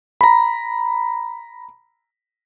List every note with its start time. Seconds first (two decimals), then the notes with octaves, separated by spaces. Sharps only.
0.21 A#5 B5